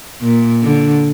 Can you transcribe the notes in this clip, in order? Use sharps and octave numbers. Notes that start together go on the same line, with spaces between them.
A#2
D3